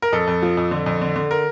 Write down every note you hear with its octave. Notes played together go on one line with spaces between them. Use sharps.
A#4
F2 A4
F2
F3
F2
D3
F2
D3
D3
A#4